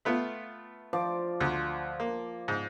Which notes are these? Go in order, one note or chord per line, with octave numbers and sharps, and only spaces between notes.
A3 B3 F4
F3 D5
D2
A#3
G#2